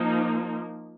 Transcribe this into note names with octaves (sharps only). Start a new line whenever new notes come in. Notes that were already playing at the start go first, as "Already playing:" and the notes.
Already playing: F3 A#3 D#4